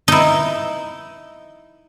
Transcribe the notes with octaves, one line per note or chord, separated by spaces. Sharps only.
D#4 E4